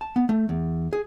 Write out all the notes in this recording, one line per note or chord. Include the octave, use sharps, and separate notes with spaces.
A5
B3
A3
E2
G#4